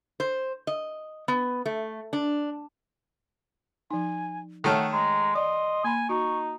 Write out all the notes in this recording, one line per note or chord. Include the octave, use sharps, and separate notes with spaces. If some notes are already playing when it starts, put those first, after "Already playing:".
C5
D#5
B3
A3
D4
F3 D#4 G#5
D#3 A3 A4 C#5 F#5 F6
G#3 A#5
D5 D#5 C6
A#3 G#5 B5
D#4 F#4 C#6